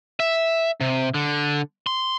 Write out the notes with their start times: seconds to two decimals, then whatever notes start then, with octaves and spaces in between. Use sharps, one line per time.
0.20 E5
0.81 C3
1.14 D3
1.87 C6